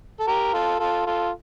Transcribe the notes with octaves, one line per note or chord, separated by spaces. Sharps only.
A4
G4 A#4
F4 A4
F4 A4
F4 A4